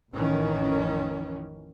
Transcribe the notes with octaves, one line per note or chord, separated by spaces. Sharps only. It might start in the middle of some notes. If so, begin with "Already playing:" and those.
A1 F2 D#3 E3 C#4